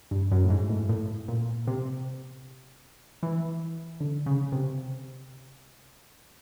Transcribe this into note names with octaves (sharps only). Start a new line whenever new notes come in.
G2
F#2
A2
G#2
A2
A2
A#2
C3
E3
D3
C#3
C3